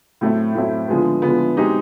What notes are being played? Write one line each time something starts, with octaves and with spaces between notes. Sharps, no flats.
A2 F#3 A3 C4 E4
A2 F#3 A3 C4 E4
D3 F3 G#3 B3
D3 F3 G#3 B3
B2 G#3 C4 D#4 G4